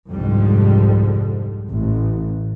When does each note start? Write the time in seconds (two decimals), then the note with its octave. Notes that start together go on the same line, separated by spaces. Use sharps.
0.10 C2 F2 G#2 D3 G3
1.70 A1